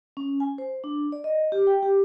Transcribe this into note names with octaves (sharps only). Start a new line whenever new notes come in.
C#4
G#5
C5
D4
D5
D#5
G4
G5
G4